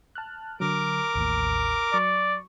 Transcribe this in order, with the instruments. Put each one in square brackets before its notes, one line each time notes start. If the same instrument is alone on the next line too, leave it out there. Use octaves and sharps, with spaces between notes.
[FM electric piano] A5 F6 F#6
[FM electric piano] D3 F#3 [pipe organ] A#4 D6
[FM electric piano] A1 D#2 A2
[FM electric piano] F#3 C#6 [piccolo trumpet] D5